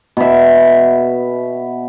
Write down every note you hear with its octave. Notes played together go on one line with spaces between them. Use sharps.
B2 E5